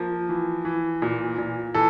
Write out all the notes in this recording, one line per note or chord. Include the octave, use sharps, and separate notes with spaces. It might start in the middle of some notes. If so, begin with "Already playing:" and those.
Already playing: F3 A#3
E3
E3
A#2
A#2
E3 A4